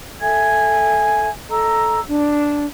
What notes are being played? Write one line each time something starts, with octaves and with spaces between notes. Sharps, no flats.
A4 E5 G#5 G#6
A4 D#5 A#5 E6
D4